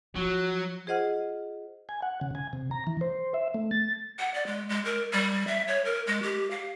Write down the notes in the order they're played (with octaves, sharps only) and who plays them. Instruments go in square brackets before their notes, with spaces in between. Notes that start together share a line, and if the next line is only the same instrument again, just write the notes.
[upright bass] F3 [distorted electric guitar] F#3 [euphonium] F#4
[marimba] F4 G#4 C5 D#5 F#5 F6
[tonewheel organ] G#5
F#5
C#3
G#5
C3
A#5
E3
C5
E5
A3
A6
[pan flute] F#5
D5
G#3
G#3
A#4
G3
E5
C#5
A#4
G#3
G4
F5